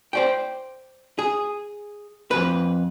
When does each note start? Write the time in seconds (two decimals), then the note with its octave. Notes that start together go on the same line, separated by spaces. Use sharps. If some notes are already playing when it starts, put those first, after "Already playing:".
0.13 C5 D5 G5
1.19 G#4
2.31 F2 B2 B4